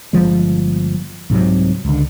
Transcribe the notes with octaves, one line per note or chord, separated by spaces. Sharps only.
G1 F2 F3 G#3
C2 G#2 C3 F#3
C#2 D3